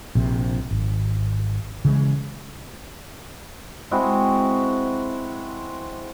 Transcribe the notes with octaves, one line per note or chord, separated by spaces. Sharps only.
A#1 C3
G#1
C#3 E3 F#3 G#3
G#3 C4 E4 F#4